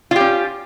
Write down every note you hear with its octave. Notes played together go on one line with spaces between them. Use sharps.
C#4 F4 G4